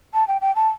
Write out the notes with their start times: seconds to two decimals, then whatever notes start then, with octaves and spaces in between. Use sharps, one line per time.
0.14 A5
0.28 G5
0.41 G5
0.56 A5